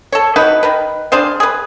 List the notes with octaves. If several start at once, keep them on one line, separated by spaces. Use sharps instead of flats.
A4 C#5
D#4 E4 F#4 B4
D#3 A#4 B4
D4 G#4 C5 F5
G#4 B4